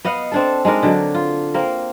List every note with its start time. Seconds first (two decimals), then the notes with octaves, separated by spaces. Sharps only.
0.05 B3 D#5 F5 F#5
0.32 C4 D4 A4
0.65 G#3 D4 D#4 A#4
0.83 D3 F#3
1.15 F4
1.54 A#3 C4 A#4